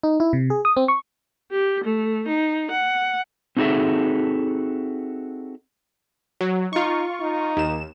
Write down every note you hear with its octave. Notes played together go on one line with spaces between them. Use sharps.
D#4
E4
C3
G#4
D#6
C4
C#6
G4
A3
D#4
F#5
C4 D#4 F#4 G#4 A4 E5
F#3
D#4 F4 C#6
D#4
D#2 E7